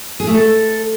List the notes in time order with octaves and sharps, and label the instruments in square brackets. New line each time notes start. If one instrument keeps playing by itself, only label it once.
[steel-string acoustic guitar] G#4
A3
A4